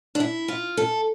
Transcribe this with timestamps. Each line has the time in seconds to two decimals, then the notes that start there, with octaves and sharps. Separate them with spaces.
0.15 D4
0.20 E4
0.48 F4
0.77 A4